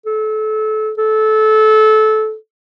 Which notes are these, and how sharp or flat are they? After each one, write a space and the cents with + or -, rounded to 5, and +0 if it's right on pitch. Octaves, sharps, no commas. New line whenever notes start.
A4 -30
A4 -20